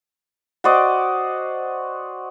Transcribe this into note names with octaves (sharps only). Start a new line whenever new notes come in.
F#4 C5 D5 D#5